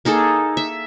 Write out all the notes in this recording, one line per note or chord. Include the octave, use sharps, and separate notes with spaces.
A#3 D#4 G#4 A4
E5